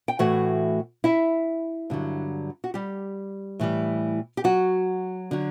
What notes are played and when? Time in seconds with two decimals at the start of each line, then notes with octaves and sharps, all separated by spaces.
0.08 G5
0.19 A2 E3 A3 F#4 F#5
1.04 E4 E5
1.90 G2 D3 F#3
2.64 F#4
2.74 G3 G4
3.60 A2 E3 G3
4.37 G4
4.44 F#3 F#4
5.31 D3 F#3